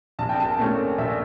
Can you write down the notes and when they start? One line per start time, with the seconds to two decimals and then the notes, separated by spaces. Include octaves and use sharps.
0.19 A#1 A5
0.29 G5
0.40 A5
0.59 A#2 A3 C#4
0.98 A#1 E5